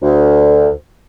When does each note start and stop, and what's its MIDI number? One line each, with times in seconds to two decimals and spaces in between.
0.02 0.67 38